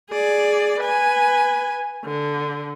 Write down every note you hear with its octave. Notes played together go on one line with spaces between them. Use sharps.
G#4 D5
B4 G#5
D3